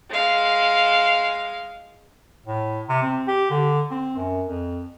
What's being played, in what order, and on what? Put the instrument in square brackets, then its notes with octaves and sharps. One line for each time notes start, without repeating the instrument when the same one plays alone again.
[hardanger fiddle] G#3 F5
[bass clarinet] A2
C3
C4
G4
D3
C4
F#2
F2